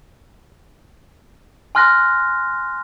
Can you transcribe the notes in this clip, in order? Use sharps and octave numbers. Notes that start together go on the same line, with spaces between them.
G#5 C6 F6 F#6 A#6